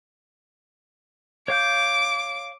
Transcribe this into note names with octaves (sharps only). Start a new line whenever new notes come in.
C#5 F5 D6 G6